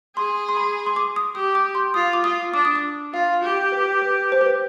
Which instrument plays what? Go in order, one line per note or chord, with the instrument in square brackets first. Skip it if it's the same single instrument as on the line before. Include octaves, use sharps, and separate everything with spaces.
[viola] G#4 [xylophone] C6
[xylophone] C6
B5
C6
D6
D#6
[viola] G4 [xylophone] D#6
[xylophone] D6
C6
[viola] F4 [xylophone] D#6
[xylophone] D6
[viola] F4 [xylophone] D#6
[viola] D4 [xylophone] D6
[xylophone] D#6
D6
[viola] F4 [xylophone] F5
[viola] G4
[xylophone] B4
B4
C5
B4
C5